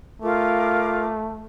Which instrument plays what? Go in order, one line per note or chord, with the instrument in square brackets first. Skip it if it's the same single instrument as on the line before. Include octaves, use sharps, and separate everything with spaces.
[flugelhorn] A3 [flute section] F4 A#4 D6